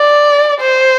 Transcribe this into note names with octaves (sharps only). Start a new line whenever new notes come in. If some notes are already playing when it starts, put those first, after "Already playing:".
Already playing: D5
C5